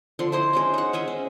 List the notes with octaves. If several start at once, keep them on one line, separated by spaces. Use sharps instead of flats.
D3 F3 C6
E4 C5 D#5
G#3 C#4 C5
D#4 F#5
C#4 G#4 D#5 E5
C#4